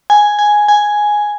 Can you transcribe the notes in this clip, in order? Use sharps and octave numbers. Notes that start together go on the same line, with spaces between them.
G#5
G#5
G#5